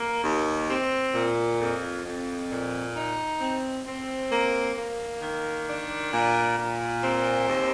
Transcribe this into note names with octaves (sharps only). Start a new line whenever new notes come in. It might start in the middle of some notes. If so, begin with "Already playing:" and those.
Already playing: A#3
D#2
C4
A#2
F2
F2
A#2
D#4
C4
C4
A#3
A#3
D#3
D4
A#2
A#2
C4
D#2